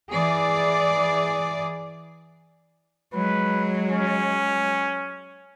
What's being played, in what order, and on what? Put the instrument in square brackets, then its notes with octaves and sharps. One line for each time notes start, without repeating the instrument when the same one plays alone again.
[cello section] E3 G#4 D5
[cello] F#3 G#3 [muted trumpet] B4
[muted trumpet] C#4